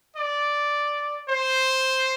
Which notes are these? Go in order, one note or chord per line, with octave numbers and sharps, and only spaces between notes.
D5
C5